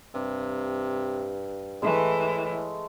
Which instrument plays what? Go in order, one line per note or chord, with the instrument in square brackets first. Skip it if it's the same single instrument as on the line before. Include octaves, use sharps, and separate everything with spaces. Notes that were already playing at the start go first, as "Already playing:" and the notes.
[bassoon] G2 [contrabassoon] C3
[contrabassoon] A2 [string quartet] E3 [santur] G#3 A3